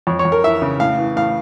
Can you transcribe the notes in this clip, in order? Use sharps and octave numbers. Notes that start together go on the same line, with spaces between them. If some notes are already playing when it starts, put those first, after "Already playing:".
F2 C#5
C#5
F2
A#4
E3 E5
C#3
A2 F5
E3
A2 F5